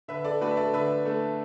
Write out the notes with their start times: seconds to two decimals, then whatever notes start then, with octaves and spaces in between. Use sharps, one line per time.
0.08 D3 B4 E5
0.25 A4 D5
0.41 A3 D4 F#4 B4
0.51 E5
0.57 A4 D5
0.73 D3 B4 E5
1.05 A3 D4